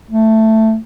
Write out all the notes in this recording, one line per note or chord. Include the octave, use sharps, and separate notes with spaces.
A3